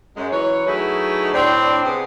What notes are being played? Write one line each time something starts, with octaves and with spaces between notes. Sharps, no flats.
F#2 G#3
E3 F#3 B4 C#5
F#3 A3 D#4 E4 G#4 B4
A2 C4 D4
C3 B3 G#4